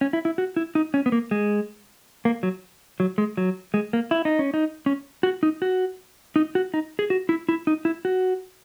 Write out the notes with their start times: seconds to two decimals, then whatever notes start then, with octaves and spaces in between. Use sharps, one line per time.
0.01 C#4
0.13 E4
0.25 E4
0.38 F#4
0.56 E4
0.75 D#4
0.94 C#4
1.06 B3
1.12 A#3
1.31 G#3
2.25 A#3
2.43 F#3
3.00 F#3
3.18 G#3
3.37 F#3
3.74 G#3
3.93 A#3
4.11 E4
4.25 D#4
4.39 C#4
4.54 D#4
4.86 C#4
5.23 F#4
5.43 D#4
5.62 F#4
6.36 D#4
6.55 F#4
6.74 D#4
6.99 G#4
7.10 F#4
7.29 E4
7.49 E4
7.67 D#4
7.85 E4
8.05 F#4